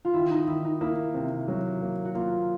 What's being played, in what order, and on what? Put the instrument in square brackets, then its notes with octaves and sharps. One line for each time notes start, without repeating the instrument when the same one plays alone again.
[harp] F4
[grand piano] D#3 [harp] E4
[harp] D#4
[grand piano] D#3 [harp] E4
[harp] D#4
[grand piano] A#3 [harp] E4
[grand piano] C3
F#3
A#3
[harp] F#4
[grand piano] A#3 [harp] F4